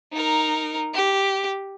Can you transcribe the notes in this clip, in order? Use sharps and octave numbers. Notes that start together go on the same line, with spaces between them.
D#4 A#4
G4